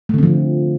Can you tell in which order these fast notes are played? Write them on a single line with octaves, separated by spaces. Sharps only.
A3 D3 C4 F3